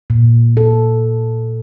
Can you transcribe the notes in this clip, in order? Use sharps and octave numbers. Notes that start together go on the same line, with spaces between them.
A#2
A4